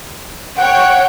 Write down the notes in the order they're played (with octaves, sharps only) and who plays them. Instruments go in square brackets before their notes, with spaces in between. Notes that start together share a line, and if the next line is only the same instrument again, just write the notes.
[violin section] C#5 G5 [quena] F#5